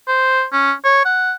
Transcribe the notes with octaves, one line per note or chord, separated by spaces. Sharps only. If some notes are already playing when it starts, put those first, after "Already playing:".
C5
C#4
C#5
F#5